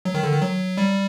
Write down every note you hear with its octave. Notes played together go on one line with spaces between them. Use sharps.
F#3
D#3
D3
D#3
F#3
G3